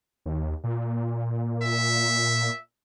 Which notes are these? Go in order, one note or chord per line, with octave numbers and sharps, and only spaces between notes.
D#2
A#2
E5